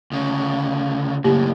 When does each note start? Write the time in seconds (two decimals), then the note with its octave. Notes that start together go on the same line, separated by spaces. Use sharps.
0.12 D2 C#3
1.24 F#2 A2 C#3 A#3 G4